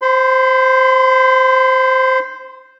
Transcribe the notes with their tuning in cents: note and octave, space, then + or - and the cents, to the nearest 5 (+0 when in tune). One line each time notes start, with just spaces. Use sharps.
C5 +0 C6 -45